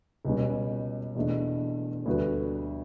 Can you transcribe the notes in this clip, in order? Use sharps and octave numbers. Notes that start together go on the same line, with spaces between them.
C#2 B2 G3 C#4
E2 B2 A3 D4
D2 D3 G3 B3 F#4